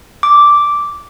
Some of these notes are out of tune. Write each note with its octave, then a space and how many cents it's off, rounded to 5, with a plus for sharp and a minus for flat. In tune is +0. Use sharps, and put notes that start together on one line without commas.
D6 -5